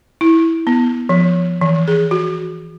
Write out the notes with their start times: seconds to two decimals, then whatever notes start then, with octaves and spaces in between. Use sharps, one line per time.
0.21 E4
0.67 B3
1.09 F3
1.61 E3
1.88 G#4
2.11 F#4